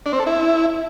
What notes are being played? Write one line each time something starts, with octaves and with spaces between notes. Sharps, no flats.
D4
C4
A4
E4